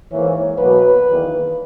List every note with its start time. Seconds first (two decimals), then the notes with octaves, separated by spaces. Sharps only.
0.12 G#2 E3 A#3 C#5
0.59 B2 F#3 A#3 B4
1.06 E2 D#3 A#3